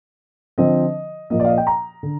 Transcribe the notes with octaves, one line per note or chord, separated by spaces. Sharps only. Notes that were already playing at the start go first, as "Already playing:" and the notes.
D3 F3 C4 D#5
A#2 F3 A#3 D#5
D5
F5
D#5
G5
A#5
D3